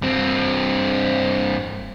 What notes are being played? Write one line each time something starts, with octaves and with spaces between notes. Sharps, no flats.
G2 C4